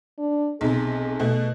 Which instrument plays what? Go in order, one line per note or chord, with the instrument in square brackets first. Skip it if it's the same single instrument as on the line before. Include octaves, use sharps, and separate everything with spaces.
[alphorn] D4
[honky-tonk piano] B1 C3 [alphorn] G#4
[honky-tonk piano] B2 A3